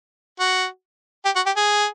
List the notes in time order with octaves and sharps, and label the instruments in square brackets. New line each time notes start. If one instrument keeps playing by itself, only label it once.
[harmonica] F#4
G4
F#4
G4
G#4